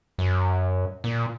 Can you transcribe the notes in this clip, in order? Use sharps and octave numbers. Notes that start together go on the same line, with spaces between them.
F#2
A#2